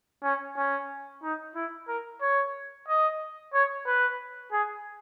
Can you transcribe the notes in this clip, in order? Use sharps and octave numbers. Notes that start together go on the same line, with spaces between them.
C#4
C#4
D#4
E4
A#4
C#5
D#5
C#5
B4
G#4